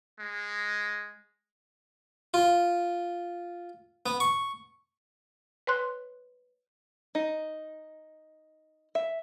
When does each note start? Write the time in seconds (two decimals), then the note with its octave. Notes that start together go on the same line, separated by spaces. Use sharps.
0.19 G#3
2.34 F4
4.06 B3
4.20 C#6
5.67 B4 C#5 C6 F#6
7.15 D#4
8.95 E5